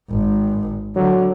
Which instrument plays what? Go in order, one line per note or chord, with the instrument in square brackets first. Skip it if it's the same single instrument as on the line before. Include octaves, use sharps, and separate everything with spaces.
[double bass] G#1
[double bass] D3 [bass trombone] F#3